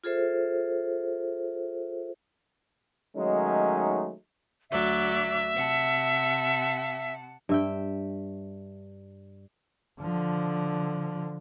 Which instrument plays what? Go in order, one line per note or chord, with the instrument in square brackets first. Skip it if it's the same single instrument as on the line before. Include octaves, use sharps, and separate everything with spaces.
[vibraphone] F4 G#4 A4 C5 E5
[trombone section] D#3 F#3 G#3 A3 C#4 D#4
[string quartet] D2 F#3 D5 [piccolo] E5
[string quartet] C3 F#5 A5
[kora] G2 E5 G5
[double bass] D3 F3